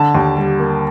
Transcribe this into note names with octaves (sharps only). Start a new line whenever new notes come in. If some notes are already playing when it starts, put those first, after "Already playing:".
Already playing: D3 A5
D#2
G3
A#3